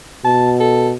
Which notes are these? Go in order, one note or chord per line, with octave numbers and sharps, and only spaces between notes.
B2 A5
A4